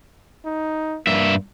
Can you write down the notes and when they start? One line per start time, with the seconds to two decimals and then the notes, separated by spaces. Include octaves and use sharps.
0.46 D#4
1.07 G2 A#3 E5